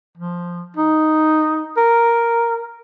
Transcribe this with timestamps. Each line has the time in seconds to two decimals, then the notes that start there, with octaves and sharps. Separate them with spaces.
0.17 F3
0.77 D#4
1.77 A#4